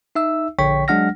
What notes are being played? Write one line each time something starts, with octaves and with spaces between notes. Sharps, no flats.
D#4 E5 E6
A#1 D3 C#5 G5 C#6 B6
F#3 G#3 D4 F#5 F6 A#6